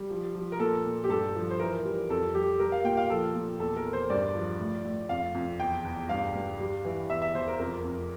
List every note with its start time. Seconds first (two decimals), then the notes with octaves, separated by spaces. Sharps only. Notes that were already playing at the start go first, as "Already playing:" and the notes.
Already playing: G3
0.10 F3
0.35 F3
0.52 A#4
0.59 A#2 A4
0.85 A#2
1.04 G4
1.09 G2 A4
1.35 F3
1.51 C5
1.59 E3 A#4
1.84 G3
2.10 F2 A4
2.34 G3 G4
2.59 G3 A#4
2.72 F5
2.84 A#2 G5
2.97 F5
3.09 F3 A4
3.35 A#2
3.60 E2 A4
3.76 A#4
3.85 E2
3.93 C5
4.10 G2 D5
4.34 F3
4.59 A2
4.85 A2
5.09 F2 F5
5.34 F2
5.60 E2 G5
5.84 E2
6.09 G2 F5
6.35 G2
6.59 G3
6.85 E3
7.09 E2 E5
7.22 E5
7.34 E2 C5
7.48 A#4
7.59 F2 A#4
7.85 F2